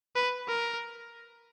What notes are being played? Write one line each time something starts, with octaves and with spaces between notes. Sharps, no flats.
B4
A#4